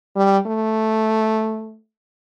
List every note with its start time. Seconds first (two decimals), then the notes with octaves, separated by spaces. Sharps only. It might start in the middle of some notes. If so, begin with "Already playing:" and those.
0.16 G3
0.46 A3